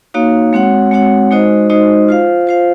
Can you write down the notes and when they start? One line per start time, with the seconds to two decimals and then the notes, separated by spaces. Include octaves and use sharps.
0.14 A#3 D#4 F#4 C#5 F5
0.53 G#3 C4 F#4 C#5 F#5
0.91 G#3 C4 F#4 C#5 F#5
1.31 G#3 D#4 F#4 C5 D#5
1.69 G#3 D#4 F#4 C5 D#5
2.09 F4 C5 F5
2.47 F4 C5 F5